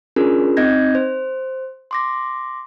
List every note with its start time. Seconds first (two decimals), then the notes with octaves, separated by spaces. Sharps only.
0.16 C#4 D4 F4 G#4 A#4
0.57 C4 D#4 D#5 G6 G#6 A#6
0.95 C5
1.91 C6 D6 A#6